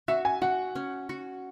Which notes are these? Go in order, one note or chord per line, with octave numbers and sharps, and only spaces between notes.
F#4 E5
G#5
F#4 F#5
C#4
F#4